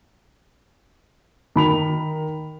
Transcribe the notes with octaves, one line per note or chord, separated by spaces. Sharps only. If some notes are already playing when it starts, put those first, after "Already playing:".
D#3 B5 F7